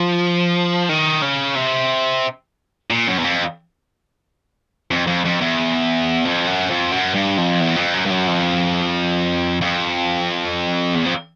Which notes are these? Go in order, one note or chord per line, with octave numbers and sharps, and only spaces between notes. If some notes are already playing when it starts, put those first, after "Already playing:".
Already playing: F3
D#3
C#3
C3
A#2
F#2
E2
F2
F2
F2
F2
E2
F2
F#2
F2
F#2
G2
F2
E2
F2
F#2
G2
F#2
F2
F2
E2
F2